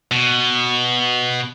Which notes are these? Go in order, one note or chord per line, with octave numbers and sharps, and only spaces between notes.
B2